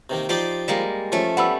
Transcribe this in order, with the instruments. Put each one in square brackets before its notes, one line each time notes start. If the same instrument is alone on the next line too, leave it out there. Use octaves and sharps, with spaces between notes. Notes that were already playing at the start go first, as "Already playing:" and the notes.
[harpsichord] C3 D#3 A#3
[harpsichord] F3 D#4 D6 [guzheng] G4 D5 C6
[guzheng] G3 G#3 A#3
[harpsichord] F3 [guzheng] A3 C#4
[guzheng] G3 B3 [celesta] F#5 B5 E6